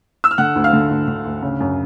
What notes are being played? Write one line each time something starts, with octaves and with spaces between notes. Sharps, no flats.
E6
F6
D3 F#5 F#6
D2
F5 F6
D3
D2
D3
D2
C#3
F#2